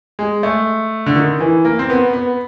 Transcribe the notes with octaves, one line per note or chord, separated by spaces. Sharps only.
G#3
A3
D3
D#3
E3
A#3
C4
B3
B3